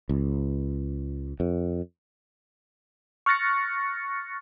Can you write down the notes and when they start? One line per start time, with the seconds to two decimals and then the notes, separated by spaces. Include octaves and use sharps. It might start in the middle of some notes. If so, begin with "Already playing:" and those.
0.09 C#2
1.40 F2
3.26 C#6 F6 F#6 A6 A#6 C#7